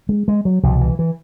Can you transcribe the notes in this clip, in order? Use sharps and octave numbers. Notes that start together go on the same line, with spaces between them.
G#3
G#3
F#3
C2 B2 F3
E3
E3